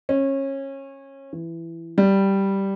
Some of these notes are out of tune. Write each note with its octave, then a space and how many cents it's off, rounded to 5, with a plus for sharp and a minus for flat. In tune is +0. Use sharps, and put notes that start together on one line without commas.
C#4 -25
E3 +15
G3 -5